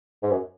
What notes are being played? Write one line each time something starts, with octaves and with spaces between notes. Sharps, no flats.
G#2
F#2